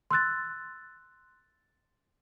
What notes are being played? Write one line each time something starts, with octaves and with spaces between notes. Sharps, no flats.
C6 E6 F#6 A6